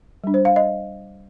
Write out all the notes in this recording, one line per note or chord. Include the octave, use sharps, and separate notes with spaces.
G3 D4
C5
F5
D#5